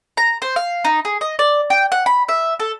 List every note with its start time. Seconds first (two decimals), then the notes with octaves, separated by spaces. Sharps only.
0.17 A#5
0.42 C5
0.56 F5
0.85 D#4
1.05 G#4
1.21 D#5
1.39 D5
1.70 G5
1.92 F#5
2.06 B5
2.29 E5
2.60 A4